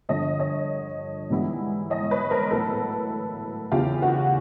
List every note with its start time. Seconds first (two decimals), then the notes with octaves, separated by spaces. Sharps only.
0.09 G2 D3 F3 C#5 D#5
0.39 C#5 D#5
1.30 G#2 E3 G3 B3 E4
1.90 C#5 D#5
2.11 B4 C#5
2.31 A#4 C5
2.51 A2 F#3 B3 E4 A4 B4
3.72 E2 C#3 E3 F4 G4
4.02 F#4